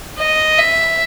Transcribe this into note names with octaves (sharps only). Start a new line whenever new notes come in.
D#5
E5